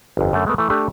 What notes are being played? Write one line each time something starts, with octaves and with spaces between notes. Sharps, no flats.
G1 F2
F#2 D3 A3
G#3 A3 B3 A#4
E3 A3
A3 D4 G4 A4